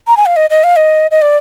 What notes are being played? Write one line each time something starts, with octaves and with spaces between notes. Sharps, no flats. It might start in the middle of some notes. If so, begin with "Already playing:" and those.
A#5
G#5
F5
D#5
D#5
F5
D#5
D#5
D5